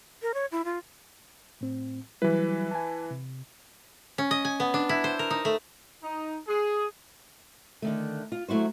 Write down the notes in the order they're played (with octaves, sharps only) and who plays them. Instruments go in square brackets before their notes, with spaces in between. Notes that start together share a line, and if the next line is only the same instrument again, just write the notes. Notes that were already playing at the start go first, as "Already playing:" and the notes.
[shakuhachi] A#4
C#5
E4
F4
[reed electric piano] A2 C4
[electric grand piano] E3 B4 [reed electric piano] F#3 G3 E4
[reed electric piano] G#5 A5
C3
[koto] C#4
D#5
G#5
B3
D4
E4
C5
A#4
D#4
A3
[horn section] D#4
G#4
[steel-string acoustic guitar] D3 D#3 A3
F4
F#3 A3 E4 F#4 C5